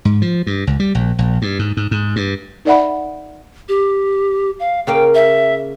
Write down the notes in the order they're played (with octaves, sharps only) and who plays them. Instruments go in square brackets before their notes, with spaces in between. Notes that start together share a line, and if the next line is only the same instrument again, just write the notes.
[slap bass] G#2
F3
G2
C#2
G3
A#1
A#1
G2
G#2
G#2
G#2
G2
[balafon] D#4 A#4 D5 E5 F#5 B5
[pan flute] G4
F5
[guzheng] C#3 A#3 F5 [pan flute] G5
[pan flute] E5